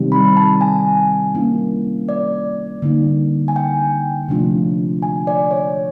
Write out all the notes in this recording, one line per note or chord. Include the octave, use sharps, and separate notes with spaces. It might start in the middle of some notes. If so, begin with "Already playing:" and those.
Already playing: C3 D#3 G3 C4
B5
A5
G#5
G3 A#3 C#4 E4
D5
D3 G3 A#3 D#4
G#5
G5
C3 F3 A3 D4 F4
G#5
D5
C#5